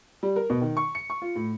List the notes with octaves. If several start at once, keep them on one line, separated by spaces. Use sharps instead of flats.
G3
A#4
B2
D#3
C#6
C#7
C#6
F4
A2